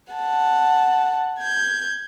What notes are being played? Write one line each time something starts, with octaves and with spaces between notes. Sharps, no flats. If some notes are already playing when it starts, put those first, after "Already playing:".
F#5 A5
G6 G#6